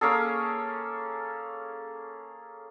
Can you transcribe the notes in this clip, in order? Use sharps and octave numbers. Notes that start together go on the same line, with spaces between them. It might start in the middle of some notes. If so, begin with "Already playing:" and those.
A#3 C#4 G#4 A4